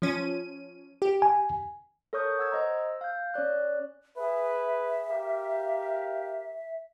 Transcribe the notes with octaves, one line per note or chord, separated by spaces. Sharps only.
F3 C#4 D#7
G4
G#5
A4 A#4 C#5 C#6 D#6 G6
F#5 E6 G#6
C5 D#5 A#5
E6
F5 G6
C#4 C#5 D5 F#6
G#4 B4 E5
G4 A#4 F5